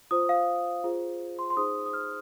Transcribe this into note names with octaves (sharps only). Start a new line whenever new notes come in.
F4 C5 D#6
F5
F4 G#4 C5
C6
C6
D#4 G#4 C5 D#6
D#6
F6